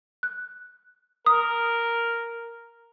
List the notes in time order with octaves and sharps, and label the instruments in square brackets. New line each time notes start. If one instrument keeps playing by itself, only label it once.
[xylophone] F#6
[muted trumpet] A#4 [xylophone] D#6